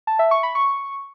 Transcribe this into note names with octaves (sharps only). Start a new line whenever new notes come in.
A5
E5
C#6
B5
C#6